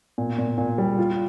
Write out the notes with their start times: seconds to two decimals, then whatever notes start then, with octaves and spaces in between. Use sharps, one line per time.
0.18 A#2
0.38 A#2
0.58 A#2
0.78 G3
0.99 F4